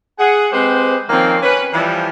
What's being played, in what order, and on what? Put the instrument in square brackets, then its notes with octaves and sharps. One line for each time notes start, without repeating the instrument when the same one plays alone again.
[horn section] G#4 F#5
G#3 C4 G4 B4 C5
D#3 F3 A#3 C4 C#4 D#4
C#4 B4
E3 F3 G3